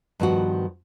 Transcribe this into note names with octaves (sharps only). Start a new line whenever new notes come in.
G2 D#3 F3 B3 F#4